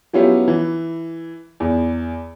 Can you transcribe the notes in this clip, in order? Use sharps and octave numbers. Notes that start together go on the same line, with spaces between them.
F#3 B3 C#4 E4 F4 G4
E3
E2